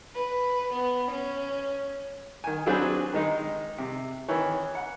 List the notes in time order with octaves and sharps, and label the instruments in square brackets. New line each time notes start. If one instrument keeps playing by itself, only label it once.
[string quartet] B4
B3
C#4
[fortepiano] D#3 G#5
F#3 C4 D4 G#4 B4 C5
D#3 G#3 D#4
C3
D#3 E3 C#5
F#5